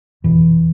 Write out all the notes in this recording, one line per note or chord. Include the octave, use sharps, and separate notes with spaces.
F1 E2 B2 E3